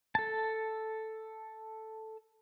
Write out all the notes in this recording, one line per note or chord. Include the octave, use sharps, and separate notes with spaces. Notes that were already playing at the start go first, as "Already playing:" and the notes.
A4 A5